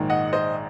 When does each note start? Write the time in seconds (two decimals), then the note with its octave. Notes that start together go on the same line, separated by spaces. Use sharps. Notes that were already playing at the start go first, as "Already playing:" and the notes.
Already playing: A#1 G#2 D#3
0.10 D#5 F#5
0.33 C5 D#5